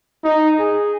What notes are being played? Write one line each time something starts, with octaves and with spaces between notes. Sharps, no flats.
D#4
G#4